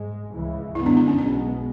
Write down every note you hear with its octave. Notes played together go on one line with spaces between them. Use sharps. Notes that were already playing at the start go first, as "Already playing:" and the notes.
Already playing: G#2 G#3
C#2 C#3 E3 G#3
F#2 D3 G#3 B3 E4
D4
D4
C#4
B1 B2 G#3 B3 D4